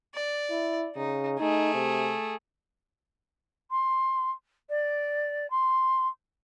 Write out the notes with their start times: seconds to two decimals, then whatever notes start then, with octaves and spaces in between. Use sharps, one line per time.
0.15 D5
0.50 E4
0.96 C#3 D#4
1.39 A3 D#4 G#4
1.74 C3
3.71 C6
4.70 D5
5.51 C6